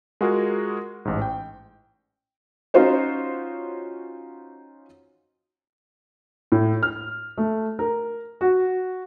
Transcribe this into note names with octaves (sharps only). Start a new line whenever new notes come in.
G#3 F4 F#4 G#4 A#4
A1 G#2
G5
C#4 D#4 F4 F#4 C5 C#5
A2
F6
A3
A#4
F#4